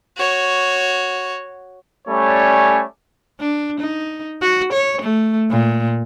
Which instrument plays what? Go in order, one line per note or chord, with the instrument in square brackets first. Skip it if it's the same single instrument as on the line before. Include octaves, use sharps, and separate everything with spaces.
[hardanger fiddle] F#4 C#5
[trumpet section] G3 A3 C#4 C#5 D5 G#5
[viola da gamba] D4
D#4
F#4
C#5
A3
A#2